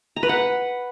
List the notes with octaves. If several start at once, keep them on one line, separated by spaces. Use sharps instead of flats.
A#5
B4
F#5